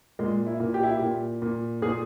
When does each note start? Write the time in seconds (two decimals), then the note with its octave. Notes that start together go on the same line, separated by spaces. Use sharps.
0.19 A#2 G#3
0.47 E4
0.60 A#2
0.74 G4
0.83 E4
0.92 G4
1.01 A#2
1.42 A#2
1.82 A#2 G#4